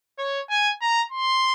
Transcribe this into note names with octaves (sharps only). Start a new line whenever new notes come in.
C#5
G#5
A#5
C6